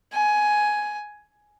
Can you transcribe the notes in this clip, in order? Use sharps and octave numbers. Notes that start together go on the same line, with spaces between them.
G#5